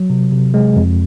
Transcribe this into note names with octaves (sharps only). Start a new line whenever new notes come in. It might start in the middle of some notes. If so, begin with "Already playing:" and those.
Already playing: F#3
C3
C3
G#3
F2